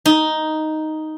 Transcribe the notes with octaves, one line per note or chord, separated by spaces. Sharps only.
D#4